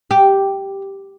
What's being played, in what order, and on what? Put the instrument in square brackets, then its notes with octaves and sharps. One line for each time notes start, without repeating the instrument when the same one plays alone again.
[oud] G4